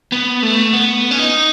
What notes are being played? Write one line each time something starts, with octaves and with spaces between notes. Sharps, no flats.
B3
A3
B3
C#4
D#4